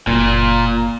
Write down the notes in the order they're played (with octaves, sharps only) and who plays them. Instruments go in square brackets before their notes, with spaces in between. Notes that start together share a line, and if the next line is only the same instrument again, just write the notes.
[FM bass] F#1 [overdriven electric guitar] A#2